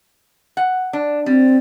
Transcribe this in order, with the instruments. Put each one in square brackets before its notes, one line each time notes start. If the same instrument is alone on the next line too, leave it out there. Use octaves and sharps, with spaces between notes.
[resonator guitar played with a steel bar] F#5
D4
[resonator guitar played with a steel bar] G3 [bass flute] C4